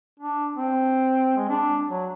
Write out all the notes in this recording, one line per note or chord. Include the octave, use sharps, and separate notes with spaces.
D4
C4
G#3
D4
F#3